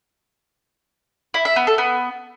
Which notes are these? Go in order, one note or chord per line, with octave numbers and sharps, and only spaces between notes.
E4
E5
B3
A4
B3